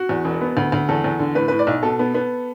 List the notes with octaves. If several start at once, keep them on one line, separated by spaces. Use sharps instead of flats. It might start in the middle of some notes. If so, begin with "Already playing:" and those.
Already playing: F#4
E2
E1
B3
D2
D2
E2 A4
E2
D3
A2 B4
A2 B4
D5
B1
B2 A4
B3
B3